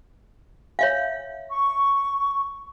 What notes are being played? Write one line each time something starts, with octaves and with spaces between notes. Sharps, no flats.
C#5 E5 F5
C#6